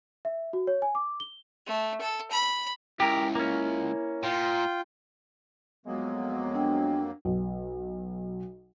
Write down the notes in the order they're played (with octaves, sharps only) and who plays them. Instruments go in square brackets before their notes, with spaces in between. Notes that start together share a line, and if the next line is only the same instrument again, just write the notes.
[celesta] E5
F#4
C#5
G#5
D6
G7
[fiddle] A3
A4
B5
[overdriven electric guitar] C#2 [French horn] E4 [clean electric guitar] G4 A#4
[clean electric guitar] A#3 C#4
[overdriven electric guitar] A#2 [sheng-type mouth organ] F4 G5
[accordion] F2 F#3 A#3 [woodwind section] G#3 B3
[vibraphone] D4 G5
[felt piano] B1